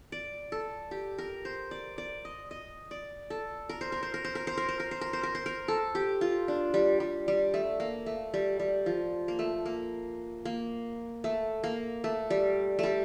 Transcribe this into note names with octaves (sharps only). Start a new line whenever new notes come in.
D5
A4
G4
A#4
C5
D5
D5
D#5
D#5
D5
A4
A#4
C5
A#4
C5
A#4
C5
A#4
C5
A#4
C5
A#4
C5
A#4
C5
A#4
C5
A#4
A4
G4
F4
D4
G3
G3
G3
A3
A#3
A3
G3
G3
F3
A#3
A3
A#3
A#3
A3
A#3
A3
G3
G3 A3